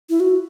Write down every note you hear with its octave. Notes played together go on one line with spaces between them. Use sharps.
E4
F#4